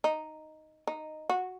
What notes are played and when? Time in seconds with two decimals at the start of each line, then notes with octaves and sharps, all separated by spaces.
0.04 D#4
0.87 D#4
1.29 F#4